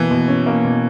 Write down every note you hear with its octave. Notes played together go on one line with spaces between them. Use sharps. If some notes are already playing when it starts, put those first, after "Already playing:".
Already playing: B2 E3 A#3
B2
C#4
A#3
B2